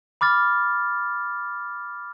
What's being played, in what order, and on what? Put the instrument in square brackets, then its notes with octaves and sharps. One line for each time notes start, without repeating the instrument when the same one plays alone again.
[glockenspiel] B5 D6 F6 A6